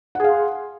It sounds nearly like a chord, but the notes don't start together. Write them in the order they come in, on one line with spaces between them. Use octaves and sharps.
F#5 G#4 F5 C6